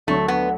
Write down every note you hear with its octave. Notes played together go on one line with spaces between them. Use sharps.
D2 D3 F#3 A3
B3